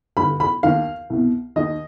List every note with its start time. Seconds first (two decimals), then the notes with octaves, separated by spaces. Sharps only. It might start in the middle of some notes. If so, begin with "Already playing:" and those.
0.17 G2 D3 B5
0.40 B5
0.63 D#2 D#3 F5
1.10 C2 B2
1.56 D#2 D#3 D#5